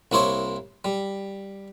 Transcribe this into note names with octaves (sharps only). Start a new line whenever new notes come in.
C2 A#3 E4 C5 C#5 C#6
G3